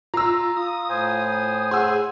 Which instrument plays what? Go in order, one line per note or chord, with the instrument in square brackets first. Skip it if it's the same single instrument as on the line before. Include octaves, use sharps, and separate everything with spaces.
[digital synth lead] F4 [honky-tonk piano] A#5 E6
[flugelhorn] F4 [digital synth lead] D#6
[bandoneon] A2 C5 G#5
[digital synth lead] G#4 [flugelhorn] F#5 [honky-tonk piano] C6 E6